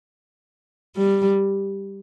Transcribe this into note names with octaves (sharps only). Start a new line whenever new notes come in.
G3